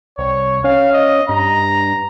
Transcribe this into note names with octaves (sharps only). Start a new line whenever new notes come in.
C2 C#5
C#4 F5
D#5
G2 A#5